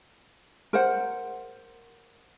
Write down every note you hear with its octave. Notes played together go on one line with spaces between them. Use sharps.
A#4 C5 F#5